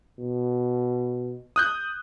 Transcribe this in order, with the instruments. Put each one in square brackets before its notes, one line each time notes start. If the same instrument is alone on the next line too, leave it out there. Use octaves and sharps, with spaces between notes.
[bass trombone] B2
[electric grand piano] D#6 F#6 G6